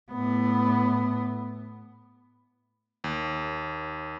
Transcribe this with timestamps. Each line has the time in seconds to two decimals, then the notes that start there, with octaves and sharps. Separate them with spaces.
0.12 A2 B3
3.04 D#2